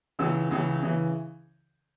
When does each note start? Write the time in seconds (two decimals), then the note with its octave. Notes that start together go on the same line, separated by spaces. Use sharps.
0.19 C#2 C#3 E3 E6
0.51 C#2 C#3 E3
0.82 C#3 E3